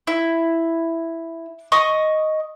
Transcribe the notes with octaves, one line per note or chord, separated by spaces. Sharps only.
E4
D#5 C#6 D#6